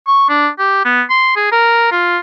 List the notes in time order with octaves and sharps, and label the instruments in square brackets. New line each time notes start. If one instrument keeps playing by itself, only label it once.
[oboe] C#6
D4
G4
B3
C6
G#4
A#4
F4